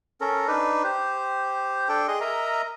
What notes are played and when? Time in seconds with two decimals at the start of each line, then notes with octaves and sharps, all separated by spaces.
0.21 C#4 A4 A#4
0.47 D4 D#4 B4
0.84 G4 C5
1.89 D4 A4 G5
2.08 G#4 D#5 C6
2.21 A#4 D#5 E5 A#5